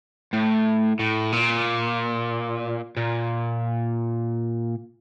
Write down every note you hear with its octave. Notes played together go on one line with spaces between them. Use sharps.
A2
A2
A#2
A#2